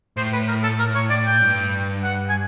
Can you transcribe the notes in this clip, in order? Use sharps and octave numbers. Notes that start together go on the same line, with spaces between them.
A2 C5
B4
A#4
A4
A#4
C#5
D5
G5
G2
F#5
G#5